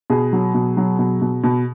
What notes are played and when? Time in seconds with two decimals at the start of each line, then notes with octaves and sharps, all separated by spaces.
0.10 B2 G#4
0.33 F#3
0.54 B2
0.77 F#3
0.99 B2
1.21 B2
1.44 B2